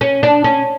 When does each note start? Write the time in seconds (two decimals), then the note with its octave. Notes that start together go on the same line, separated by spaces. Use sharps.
0.01 C#4
0.23 D4
0.44 C#4